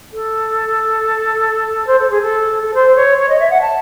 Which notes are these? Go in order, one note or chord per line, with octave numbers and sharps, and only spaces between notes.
A4
C5
A4
G#4
A4
A4
C5
C#5
C#5
D#5
E5
F#5
A5